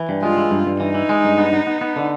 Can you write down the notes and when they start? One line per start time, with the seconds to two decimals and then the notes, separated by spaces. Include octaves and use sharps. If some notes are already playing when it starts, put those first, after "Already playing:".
Already playing: E3
0.09 G2
0.23 G#3 F4
0.37 E3
0.51 G2
0.67 G2
0.80 E3 D#4
0.94 E3
1.09 G#3
1.24 G2
1.38 B3
1.53 B3
1.67 B3
1.81 B3
1.96 D3